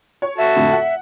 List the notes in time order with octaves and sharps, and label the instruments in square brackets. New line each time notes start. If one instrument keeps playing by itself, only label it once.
[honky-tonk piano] C#5
[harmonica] F#4 A4 [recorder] E5
[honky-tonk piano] F2 A2 D3
F#5